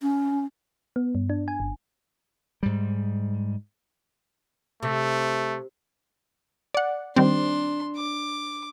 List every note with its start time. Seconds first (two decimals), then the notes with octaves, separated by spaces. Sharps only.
0.02 C#4
0.96 B3
1.15 G2
1.30 D4
1.48 G#5
1.60 G1
2.63 G#2 G3
4.83 C3 A3
6.74 D5 F#5
7.16 D#3 G3 C4 D4 C6
7.96 D6